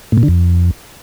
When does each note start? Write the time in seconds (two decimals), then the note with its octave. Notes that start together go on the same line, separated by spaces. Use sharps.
0.12 A2
0.18 A#2
0.23 D3
0.28 F2